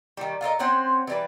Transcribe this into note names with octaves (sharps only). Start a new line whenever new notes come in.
D#3 G3
F4 A4 A#4 D#5
C4 C#4 C5 F#5
E3 G3 B4